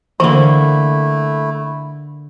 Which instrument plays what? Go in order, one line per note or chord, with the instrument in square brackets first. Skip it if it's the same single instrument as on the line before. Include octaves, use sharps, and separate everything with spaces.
[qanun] D3 A#3 [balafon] E3 [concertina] A3 E4